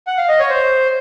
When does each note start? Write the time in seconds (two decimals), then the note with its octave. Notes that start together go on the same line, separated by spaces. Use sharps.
0.07 F#5
0.18 F5
0.29 D#5
0.39 C#5
0.50 C5